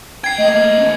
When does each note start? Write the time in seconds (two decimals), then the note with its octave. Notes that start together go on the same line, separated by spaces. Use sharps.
0.24 C2 G5 G#6 C7
0.38 A3 A#3 D#5
0.54 D#5
0.79 A3 C#4